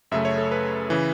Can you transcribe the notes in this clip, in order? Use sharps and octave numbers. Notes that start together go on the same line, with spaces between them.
F#2 C#3 A3 E5
C#5
A4
B4
C#3 E3